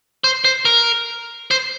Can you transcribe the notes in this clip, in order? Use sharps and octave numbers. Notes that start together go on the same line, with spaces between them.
C5
C5
A#4
C5